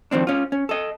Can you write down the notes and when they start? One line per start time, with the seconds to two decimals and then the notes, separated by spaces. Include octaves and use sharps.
0.11 F2 D#3 C4 D4
0.27 C#4 F4
0.52 C#4
0.69 A4 D#5